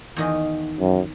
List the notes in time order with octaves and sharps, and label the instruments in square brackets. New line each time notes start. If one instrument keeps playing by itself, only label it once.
[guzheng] E2 D#3 D#5
[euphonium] F#2